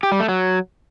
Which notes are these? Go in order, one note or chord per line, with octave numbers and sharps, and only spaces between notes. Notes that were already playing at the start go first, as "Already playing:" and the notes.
G4
G3
A3
F#3